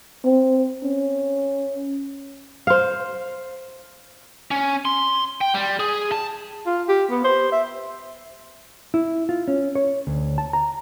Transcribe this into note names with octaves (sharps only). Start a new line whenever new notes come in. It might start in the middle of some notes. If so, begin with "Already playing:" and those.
C4
C#4
C5 F5
C#4
C6
G5
G3
G#4
A5
F4
G4
B3
C5
E5
E4
F4
C#4
C#5
D2
A5
A#5